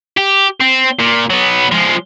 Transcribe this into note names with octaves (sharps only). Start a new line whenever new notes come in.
G4
C4
A#2
F#3 B3
F3 G#3